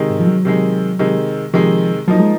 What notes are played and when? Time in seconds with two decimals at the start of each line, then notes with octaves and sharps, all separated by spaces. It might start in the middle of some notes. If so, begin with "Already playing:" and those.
Already playing: C3 D#3 G#3
0.09 G#2
0.20 F3
0.27 F#3
0.45 C3 D#3 G#3
0.99 C3 D#3 G#3
1.54 C3 D#3 F3 G#3
2.08 F3 F#3 A#3 D#4
2.20 G#3